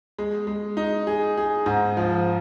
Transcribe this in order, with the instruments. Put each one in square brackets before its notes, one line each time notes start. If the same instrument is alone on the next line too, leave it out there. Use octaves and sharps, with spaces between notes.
[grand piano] G#3
G#3
D#4
G#4
G#4
G#2
F3